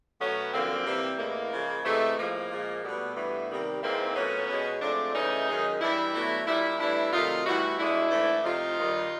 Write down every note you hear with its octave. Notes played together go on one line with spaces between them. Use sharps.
B2 F#3 A3 B3 C#4
F#2 D3 F3 A#3 C4
C3 E3 G3
A2 E3 G#3 A#3
C#3 F3 G#3
C3 E3 G#3 A3
A2 F3 G#3 A#3
A#2 F3 G#3
B2 G3 A3 B3
G2 E3 G3
C3 D#3 G3
G#2 E3 G#3 A#3 C4
A#2 F#3 A3 B3 C#4
B2 G#3
G#2 F3 A3 C4 D4
C#3 E3 A3 C#4 D#4
F#2 D#3 G#3
G2 E3 G3 D4 E4
B2 F#3 A3
A#2 G3 D4 E4
A2 E3 G3 D4 E4
C3 D#3 F#3 A3 D#4 F4
A2 E3 G3 E4 F#4
B2 G#3 D4 E4
G#2 E3 A3
C3 F3 A3 D#4 F4
G2 D#3 G3